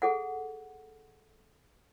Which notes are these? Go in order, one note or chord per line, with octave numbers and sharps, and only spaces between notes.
G#4 A4 F#5